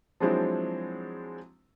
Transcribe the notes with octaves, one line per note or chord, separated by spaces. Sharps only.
F3 F#3 G#3 C4 D4 E4